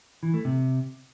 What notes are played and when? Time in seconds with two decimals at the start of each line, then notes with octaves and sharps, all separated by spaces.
0.23 E3
0.34 A3
0.45 C3